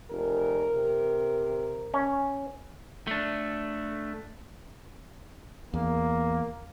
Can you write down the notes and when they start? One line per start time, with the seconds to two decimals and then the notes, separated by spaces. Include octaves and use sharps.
0.11 F1 A#4
0.76 C3
1.94 C#4
3.07 A3 D4
5.74 E2 A#3